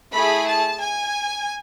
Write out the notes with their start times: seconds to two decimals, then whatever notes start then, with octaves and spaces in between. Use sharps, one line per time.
0.12 A3 E4 G#4 B5
0.45 A5
0.80 G#5